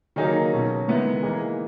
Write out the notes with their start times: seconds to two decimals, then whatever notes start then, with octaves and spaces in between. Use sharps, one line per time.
0.16 D#3 F#3 A#3 D#4 G#4
0.52 B2 F#3 C#4
0.88 D#3 G#3 B3 E4
1.23 E3 A#3 D#4 G#4